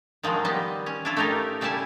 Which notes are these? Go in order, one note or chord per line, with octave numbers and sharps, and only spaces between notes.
D#3 F3 F#3 G#3
G3 B3 D#5
C#4
D4 E4 F4
A3 C#4 D#4 G4 A#4
C#3 G3 E4 G#5 A5